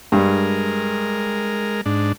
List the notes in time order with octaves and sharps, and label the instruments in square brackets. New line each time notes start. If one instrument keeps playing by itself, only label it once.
[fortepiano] G2 [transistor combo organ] G#3 A#4
[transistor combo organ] G#2 D4